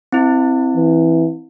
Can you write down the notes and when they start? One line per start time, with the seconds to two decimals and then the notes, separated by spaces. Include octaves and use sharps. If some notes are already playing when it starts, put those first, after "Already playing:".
0.13 C4 E4
0.76 E3